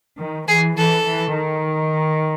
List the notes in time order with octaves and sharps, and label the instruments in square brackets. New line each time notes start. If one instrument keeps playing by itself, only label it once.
[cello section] D#3
[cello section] E3 [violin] G#4
[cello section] E3 [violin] A4
[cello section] E3
D#3